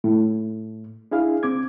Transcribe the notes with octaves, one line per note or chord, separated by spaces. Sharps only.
A2
D4 E4 G#4 F5
C#2 C4 D6 G#6